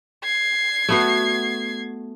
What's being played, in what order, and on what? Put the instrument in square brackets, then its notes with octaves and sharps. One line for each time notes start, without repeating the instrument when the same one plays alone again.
[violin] G#6 C7
[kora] A3 B3 F#4